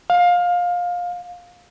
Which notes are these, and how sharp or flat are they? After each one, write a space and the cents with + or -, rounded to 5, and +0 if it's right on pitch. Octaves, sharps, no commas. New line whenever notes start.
F5 +20